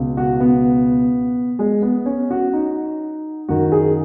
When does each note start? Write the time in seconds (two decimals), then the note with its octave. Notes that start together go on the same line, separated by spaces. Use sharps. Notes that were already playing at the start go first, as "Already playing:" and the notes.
Already playing: C#2 B2
0.17 F#4
0.40 B3
1.59 G#3
1.82 B3
2.06 C#4
2.30 F#4
2.53 D#4
3.49 F#2 D#3 F#4
3.72 G#4